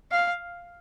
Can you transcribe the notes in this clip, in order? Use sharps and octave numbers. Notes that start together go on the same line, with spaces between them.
F5